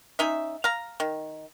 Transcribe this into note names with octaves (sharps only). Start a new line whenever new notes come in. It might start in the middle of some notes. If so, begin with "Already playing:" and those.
C#4 D#4 E5
F5 A#5
D#3